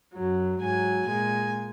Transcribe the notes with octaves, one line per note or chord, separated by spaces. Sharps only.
F#2 F#3
G#2 F#3 G#5
A#2 G#3 G#5